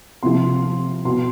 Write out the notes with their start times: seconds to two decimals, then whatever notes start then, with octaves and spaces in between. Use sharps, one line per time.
0.23 C3 F3 C6
1.05 B2 C6